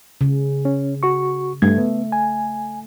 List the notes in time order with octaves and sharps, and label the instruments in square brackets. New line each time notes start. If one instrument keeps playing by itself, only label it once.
[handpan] C#3
[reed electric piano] C#4
F#4 C#6
[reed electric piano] G2 G#6 [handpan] A3
[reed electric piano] B3
G#5